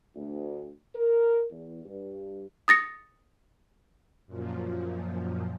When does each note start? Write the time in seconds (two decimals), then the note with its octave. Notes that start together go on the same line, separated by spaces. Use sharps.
0.15 D2
0.95 A#4
1.51 E2
1.85 G2
2.68 D#6 A6 A#6 C#7
4.27 F#2 A#2 F3